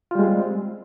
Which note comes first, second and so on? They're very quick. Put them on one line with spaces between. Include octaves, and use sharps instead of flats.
F4 G3 G#3 G#4 C4